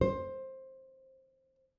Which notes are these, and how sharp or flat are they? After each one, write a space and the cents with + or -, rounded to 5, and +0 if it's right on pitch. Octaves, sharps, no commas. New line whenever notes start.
C5 +15